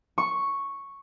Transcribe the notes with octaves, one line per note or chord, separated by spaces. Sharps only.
C#6